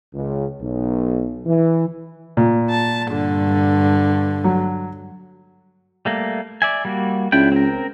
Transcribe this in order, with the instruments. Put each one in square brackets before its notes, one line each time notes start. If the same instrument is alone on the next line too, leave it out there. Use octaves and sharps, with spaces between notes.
[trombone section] C#2
B1
E3
[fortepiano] A#2
[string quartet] A5
G2 D3
[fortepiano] F#3
[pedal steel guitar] G3 A3 A#3
D5 E5 G#5
G3 A#3 F#4
[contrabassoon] C#2 [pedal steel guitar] D4 E4 G5
[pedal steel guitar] C4 A#4